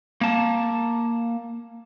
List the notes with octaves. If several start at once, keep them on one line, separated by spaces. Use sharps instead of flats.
A#3 A5